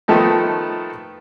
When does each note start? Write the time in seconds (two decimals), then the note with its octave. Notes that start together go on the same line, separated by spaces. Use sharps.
0.08 D#3 F3 A3 B3 D#4